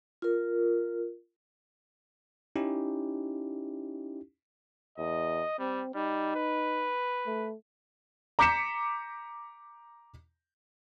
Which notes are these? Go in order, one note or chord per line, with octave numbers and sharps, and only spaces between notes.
F4 A#4
C#4 D#4 E4 G4
E2 D#5
G3 C4
G3 D#4
B4
A3
A#5 D6 G6 B6 C#7 E7